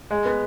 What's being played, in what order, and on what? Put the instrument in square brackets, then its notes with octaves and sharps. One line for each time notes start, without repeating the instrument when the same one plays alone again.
[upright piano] G#3
B3